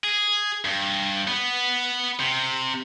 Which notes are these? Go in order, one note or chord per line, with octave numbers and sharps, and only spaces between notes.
G#4
G2
B3
C3